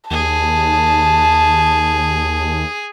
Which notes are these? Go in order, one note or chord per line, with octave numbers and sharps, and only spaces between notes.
D#2 G#4 A5